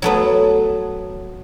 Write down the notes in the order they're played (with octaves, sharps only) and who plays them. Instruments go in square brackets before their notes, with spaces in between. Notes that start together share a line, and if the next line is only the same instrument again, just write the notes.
[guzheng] F#3 A3 B3